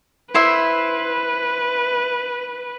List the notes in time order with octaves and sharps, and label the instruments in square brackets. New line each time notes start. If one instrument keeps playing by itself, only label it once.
[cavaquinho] E4 C5 E5 [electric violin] B4